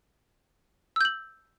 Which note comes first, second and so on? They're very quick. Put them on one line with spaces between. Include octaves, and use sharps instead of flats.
E6 G6 F#7